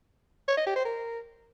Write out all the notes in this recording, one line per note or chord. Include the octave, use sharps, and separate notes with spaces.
C#5
D#5
G4
C5
A#4